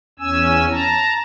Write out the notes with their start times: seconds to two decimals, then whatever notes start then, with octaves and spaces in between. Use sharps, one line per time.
0.19 E2 C#4 G#5 E6
0.70 A5 A#5